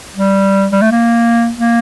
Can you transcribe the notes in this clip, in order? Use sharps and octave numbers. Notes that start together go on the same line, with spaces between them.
G3
G3
A3
A#3
A#3